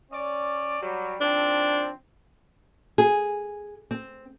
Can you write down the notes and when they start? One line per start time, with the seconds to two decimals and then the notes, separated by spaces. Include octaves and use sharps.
0.12 C#4 D5
0.82 F#3 G3
1.21 D#3 F3 C4 D4
2.98 G#4
3.91 C4